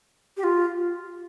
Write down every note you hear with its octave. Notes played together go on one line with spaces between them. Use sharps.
G4
F4